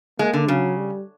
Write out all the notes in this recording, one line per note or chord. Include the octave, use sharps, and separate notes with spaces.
G#3 A#3
D3
C#3 F#3
G3